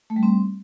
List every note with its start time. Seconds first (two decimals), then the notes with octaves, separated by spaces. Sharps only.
0.10 A3
0.16 G3
0.23 C4